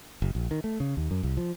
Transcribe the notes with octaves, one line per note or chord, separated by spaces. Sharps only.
F#1
A#1
D#3
A3
C#3
D#2
F#2
C2
F3